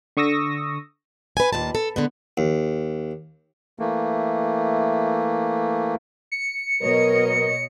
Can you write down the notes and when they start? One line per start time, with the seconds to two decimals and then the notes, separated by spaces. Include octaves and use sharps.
0.17 D3 C#6 D#6 E6 A#6
1.37 B4 G#5
1.53 D#2 A#2 A5
1.75 A4
1.96 D3 G#3 B3
2.38 D#2
3.79 E3 A3 A#3
6.32 C#7
6.82 B2 F#3 A#4 B4 C#5 D#5